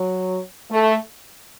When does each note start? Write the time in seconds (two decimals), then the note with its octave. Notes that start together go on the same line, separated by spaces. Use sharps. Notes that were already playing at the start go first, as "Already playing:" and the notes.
Already playing: F#3
0.70 A3